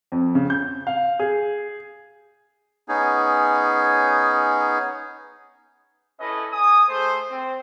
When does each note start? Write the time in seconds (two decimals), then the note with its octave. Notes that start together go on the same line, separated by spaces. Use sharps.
0.12 F2
0.35 C#3
0.50 G6
0.87 F5
1.19 G#4
2.88 B3 C#4 D#4 G#4
6.20 C#4 E4 A4 B4 D#5
6.52 G#5 D#6
6.88 A3 G#4 C5
7.29 C4